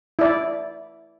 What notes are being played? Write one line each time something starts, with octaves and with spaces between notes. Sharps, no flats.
E4 D5